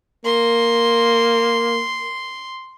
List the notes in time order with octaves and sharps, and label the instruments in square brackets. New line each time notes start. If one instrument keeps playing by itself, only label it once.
[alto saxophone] A#3 [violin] C6